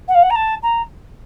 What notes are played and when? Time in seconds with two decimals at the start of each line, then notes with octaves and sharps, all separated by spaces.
0.08 F#5
0.14 F5
0.22 F#5
0.30 A#5
0.35 A5
0.62 A#5